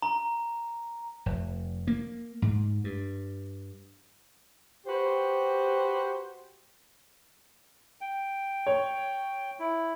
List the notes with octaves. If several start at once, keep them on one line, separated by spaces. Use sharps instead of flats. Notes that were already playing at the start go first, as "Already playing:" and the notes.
A#5
F1
A#3
G#2
G2
F#4 G4 B4 C5
G5
C#5
E4